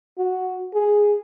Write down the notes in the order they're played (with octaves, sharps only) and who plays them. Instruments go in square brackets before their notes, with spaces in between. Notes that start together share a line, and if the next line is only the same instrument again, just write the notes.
[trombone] F#4
G#4